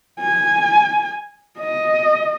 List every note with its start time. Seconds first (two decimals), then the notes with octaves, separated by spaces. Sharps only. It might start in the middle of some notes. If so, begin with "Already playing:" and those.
0.20 G#5
1.59 D#5